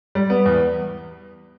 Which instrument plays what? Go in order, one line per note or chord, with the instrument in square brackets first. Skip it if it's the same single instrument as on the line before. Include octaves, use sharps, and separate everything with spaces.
[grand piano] G3
B3
E2